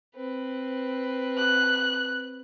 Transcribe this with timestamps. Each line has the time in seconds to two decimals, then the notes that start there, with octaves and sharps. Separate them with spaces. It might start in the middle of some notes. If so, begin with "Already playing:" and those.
0.16 C4 B4
1.38 F#6